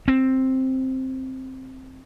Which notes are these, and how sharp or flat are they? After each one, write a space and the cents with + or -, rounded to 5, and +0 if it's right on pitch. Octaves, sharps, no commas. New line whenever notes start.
C4 +5